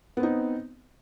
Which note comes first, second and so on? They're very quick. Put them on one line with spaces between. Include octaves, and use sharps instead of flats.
B3 C4 D#4